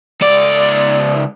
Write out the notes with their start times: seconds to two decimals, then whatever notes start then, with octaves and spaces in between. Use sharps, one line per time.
0.21 C#2 D5